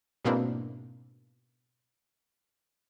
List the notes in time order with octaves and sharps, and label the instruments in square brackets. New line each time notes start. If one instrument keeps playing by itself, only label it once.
[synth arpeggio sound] G#2 B2 A#3 C4 D4 E4